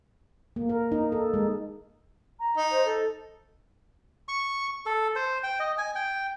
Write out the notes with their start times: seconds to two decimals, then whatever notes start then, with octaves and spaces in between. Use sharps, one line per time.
0.56 A#3
0.69 A#4
0.92 D#4
1.12 A4
1.34 G#3
2.40 A#5
2.57 D#4
2.71 C5
2.85 A4
4.28 C#6
4.86 A4
5.16 C5
5.43 G5
5.59 D#5
5.78 G#5
5.95 G5